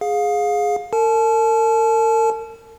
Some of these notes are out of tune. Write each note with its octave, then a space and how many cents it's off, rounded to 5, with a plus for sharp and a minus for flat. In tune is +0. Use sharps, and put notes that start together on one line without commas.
G#4 +0 F5 +25
A#4 -40 A5 -35